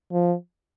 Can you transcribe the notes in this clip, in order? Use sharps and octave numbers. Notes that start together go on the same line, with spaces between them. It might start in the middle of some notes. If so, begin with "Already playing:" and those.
F3